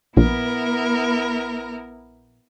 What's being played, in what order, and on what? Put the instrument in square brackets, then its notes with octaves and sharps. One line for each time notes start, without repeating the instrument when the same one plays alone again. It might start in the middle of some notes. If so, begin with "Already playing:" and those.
[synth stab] A#1 [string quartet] B3 E4 A#4